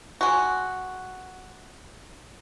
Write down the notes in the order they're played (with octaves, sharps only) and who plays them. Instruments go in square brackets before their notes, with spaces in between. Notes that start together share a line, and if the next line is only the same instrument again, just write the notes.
[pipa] G#3 F#4